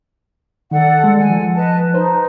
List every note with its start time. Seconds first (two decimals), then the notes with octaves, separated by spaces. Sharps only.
0.71 D#3 A4 D5 F#5
1.04 G#3
1.18 F#5 G#5
1.30 F3
1.54 B4 D#5 A5
1.94 D#4 B4 C5